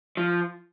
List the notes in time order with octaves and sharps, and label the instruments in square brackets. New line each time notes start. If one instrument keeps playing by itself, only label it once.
[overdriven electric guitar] F3